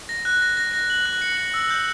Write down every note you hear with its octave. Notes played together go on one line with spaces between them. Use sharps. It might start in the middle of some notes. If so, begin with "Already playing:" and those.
A#6
F#6
A#6
A#6
A#6
F#7
F#6
C#7
F#7
E6
G6